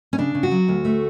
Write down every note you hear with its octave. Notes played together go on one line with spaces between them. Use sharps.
C#4
C#3 D4
C#3
F#4
F#3
D2
A3